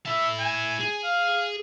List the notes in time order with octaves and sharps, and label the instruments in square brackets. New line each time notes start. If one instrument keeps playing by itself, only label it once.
[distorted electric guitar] E4 A5 [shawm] E5
[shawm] G#5
[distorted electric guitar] G#4
[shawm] F5